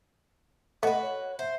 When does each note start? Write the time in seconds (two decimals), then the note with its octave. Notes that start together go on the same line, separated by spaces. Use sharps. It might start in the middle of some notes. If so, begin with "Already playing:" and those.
0.83 A3 F#4 B4 D#5
1.03 C#5
1.39 C5 E5